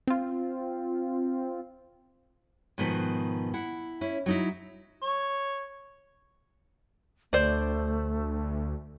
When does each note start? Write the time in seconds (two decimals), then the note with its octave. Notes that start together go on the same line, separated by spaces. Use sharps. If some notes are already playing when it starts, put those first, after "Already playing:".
0.07 C4 F4
2.78 G#2 B2 D#3 F3 B3
3.54 E4 F#5
4.01 C#4 E4
4.26 F#3 D#4 E4
5.02 C#5
7.33 D2 A3 C5 D5